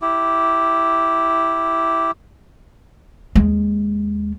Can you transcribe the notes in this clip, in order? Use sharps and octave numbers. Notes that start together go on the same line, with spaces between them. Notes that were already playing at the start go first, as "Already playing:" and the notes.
E4 G4
D#2 G#3